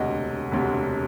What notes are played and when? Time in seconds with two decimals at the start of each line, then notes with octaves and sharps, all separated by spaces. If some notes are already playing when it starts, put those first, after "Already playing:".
Already playing: E1 D2 C3 D#5
0.52 E1 D2 C3